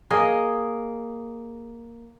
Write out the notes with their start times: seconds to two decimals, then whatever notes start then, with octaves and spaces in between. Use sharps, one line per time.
0.10 A#3 G#4 D#5